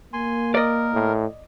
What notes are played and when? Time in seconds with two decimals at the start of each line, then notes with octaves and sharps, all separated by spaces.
0.13 A#3 G#5 C6
0.55 A#4 D5 D#5
0.93 A2